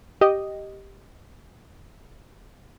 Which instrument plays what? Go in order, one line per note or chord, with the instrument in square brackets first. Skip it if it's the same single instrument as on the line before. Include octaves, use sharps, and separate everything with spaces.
[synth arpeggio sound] G4 D#5